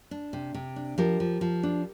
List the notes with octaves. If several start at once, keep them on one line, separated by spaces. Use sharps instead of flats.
D4
C3
C3
D4
F3 G4 A#4
F3
F3
D4